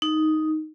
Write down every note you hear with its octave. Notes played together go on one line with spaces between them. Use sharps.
D#4